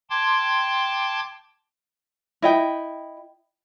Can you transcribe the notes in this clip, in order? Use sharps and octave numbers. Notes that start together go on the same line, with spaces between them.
G5 A5 C6 D6 G#6
E4 D#5 G5